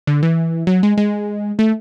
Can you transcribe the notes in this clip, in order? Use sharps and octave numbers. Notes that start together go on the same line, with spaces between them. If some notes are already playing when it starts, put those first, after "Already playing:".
D3
E3
F#3
G#3
G#3
A3